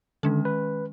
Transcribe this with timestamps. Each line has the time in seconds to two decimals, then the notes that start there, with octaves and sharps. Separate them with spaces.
0.23 D3 D#3 G#3 C#4
0.45 B4